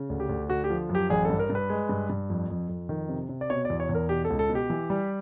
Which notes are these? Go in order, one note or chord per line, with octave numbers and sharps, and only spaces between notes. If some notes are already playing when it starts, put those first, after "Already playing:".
Already playing: C#3
D2
G4
D2
D3 F#4
G4
F3
F#2
G4
A1 G#4
A4
G2
A#4
G2
B4
G#3
G2
G2
F2
F2
F2
D#3
C3
C3
D5
B2 C#5
D5
E2
C#5
E2
A#4
B2 G4
A4
C#2
A4
B2
G4
E3
G3